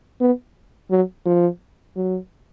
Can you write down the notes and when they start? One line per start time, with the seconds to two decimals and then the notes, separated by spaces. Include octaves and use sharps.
0.20 B3
0.91 F#3
1.26 F3
1.96 F#3